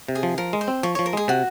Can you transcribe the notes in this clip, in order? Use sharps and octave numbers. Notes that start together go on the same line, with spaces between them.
C3
G#4
F3
F3 A#4
G#3
C5
C4
F3 C#5
F3 C#5
A#4
G#3 G#4
C3 F#4